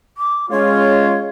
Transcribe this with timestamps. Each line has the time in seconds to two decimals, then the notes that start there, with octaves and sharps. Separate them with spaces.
0.18 D6
0.50 G#3 C#4 F4 C#5